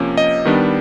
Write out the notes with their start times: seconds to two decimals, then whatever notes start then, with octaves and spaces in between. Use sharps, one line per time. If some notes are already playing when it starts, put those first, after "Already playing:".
Already playing: C3 F3 A#3 C#4
0.17 D#5
0.45 D#3 G3 B3 D4